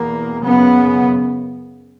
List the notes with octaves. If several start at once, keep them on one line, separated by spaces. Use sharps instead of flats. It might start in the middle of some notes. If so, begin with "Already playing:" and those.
Already playing: E2 B2 A#3
F#2 C#3 B3